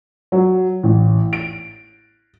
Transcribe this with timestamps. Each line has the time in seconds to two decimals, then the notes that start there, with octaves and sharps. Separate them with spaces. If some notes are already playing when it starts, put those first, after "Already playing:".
0.32 F#3
0.83 A1
1.33 D7